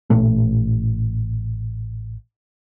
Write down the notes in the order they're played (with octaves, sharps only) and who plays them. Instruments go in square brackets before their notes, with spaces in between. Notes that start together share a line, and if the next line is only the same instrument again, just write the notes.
[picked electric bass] A1 A#2 A3